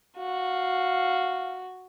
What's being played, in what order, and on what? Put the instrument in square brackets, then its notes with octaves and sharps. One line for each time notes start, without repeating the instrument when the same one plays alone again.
[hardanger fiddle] F#4 [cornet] F5